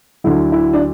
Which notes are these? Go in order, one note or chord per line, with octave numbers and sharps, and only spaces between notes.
D2 D3 F#3 E4
E4
D4